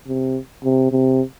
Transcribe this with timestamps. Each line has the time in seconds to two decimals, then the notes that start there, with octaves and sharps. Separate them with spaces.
0.08 C3
0.64 C3
0.92 C3